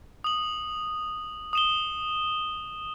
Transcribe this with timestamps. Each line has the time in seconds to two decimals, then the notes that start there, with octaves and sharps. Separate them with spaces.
0.24 D#6 F#7
1.53 D#6 E7 G7